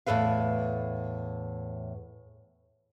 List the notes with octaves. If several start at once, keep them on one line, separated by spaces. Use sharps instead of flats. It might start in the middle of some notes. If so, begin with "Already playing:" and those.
E2 A2 A4 B4 F5